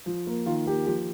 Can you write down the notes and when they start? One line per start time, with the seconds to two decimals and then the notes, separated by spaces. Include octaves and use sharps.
0.06 F3
0.27 A#3
0.46 D#3 F4
0.66 A#3 G4
0.87 F3 G4